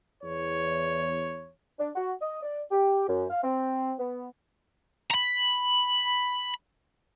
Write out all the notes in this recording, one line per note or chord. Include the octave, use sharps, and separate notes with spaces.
E2 C#5
D4
F#4
D#5
D5
G4
F#2
F5
C4
B3
A#5 B5